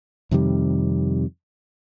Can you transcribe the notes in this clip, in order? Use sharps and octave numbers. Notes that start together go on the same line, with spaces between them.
F2 C3 D#3 G3